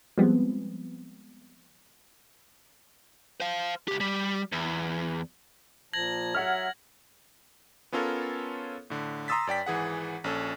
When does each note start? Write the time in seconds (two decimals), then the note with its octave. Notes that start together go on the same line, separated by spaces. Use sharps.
0.18 F3 G3 G#3 B3 C4
3.40 C5 F5
3.88 C#2 G4
4.00 G3
4.52 E2
5.94 A#2 F3 A5 G#6 A#6 F#7
6.35 F#3 C#5 E5 F#5 F6
7.92 B3 C#4 F4 A4 A#4 C#5
8.90 A2 D3
9.28 A#5 C6 D#6 E6 A6 B6
9.47 F#2 D5 G5 B6
9.66 G#1 E3 G#4 F#5
10.24 A#1 C#4 A4